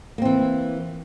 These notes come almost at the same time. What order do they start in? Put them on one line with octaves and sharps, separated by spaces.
A#3 C4 E3